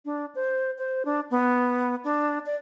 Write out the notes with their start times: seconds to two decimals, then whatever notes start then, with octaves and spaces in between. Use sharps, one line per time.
0.05 D4
0.35 C5
0.78 C5
1.05 D4
1.31 B3
2.04 D4
2.46 D5